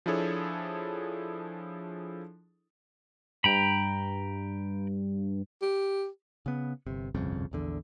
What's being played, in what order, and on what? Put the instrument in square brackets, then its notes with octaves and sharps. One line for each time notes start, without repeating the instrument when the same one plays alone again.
[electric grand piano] F3 D4 E4 G#4 A4 C#5
[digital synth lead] G2 [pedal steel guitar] G5 A#5 B5
[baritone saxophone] G4
[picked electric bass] C#3 B3
G1 C3
G1 C2 F2 C#3
A#1 E2 D3